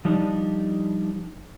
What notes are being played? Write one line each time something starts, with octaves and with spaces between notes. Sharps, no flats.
F3 G3 D4 D#4